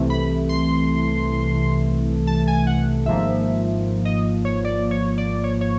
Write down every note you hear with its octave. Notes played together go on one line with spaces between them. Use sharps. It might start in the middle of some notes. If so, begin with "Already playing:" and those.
Already playing: C2 C3 E3 A3
B5
C6
A5
G#5
F#5
G#1 G#2 F3 A#3 E5
D#5
C#5
D5
C#5
D5
C#5
C#5